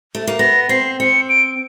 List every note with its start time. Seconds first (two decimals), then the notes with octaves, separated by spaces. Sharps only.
0.15 A3
0.27 A#3
0.39 B3 A#6
0.69 C4 C7
1.00 C4 C#7
1.29 D7